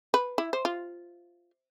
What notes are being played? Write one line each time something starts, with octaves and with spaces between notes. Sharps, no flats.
B4
E4
C5
F4